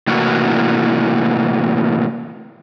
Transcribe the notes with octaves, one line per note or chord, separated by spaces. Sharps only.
A2 C3 E3 A#3 F#4